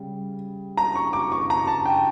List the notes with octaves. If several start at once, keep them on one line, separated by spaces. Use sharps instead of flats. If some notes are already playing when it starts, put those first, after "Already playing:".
Already playing: C#3 G3
A#5
C#6
D6
C#6
A#5
A5
G5